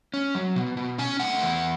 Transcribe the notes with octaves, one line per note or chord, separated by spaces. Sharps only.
C#4
F#3
B2
B2
C#4 G#5
A3 F#5
E2